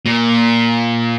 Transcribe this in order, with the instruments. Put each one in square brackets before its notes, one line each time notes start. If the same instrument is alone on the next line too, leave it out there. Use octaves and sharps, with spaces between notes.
[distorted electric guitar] A#2